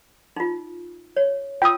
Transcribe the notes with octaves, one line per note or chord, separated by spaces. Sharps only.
D#4 F4
C#5
F4 G5 D#6 E6